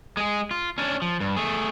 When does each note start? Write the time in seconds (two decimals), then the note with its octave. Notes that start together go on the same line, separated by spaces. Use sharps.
0.17 G#3 G#4
0.51 F4
0.78 C#4 D4
1.02 F3
1.21 G2
1.37 A3 G#4